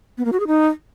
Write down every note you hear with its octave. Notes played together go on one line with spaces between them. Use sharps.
B3
A#3
F#4
G#4
D#4